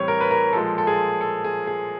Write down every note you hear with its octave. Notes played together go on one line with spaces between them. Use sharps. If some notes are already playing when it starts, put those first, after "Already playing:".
Already playing: A2 E3 G3 C4 C#5
A#4
B4
A#4
A#2 F3 G#3 A4
A4
G#4
A4
G#4
G#4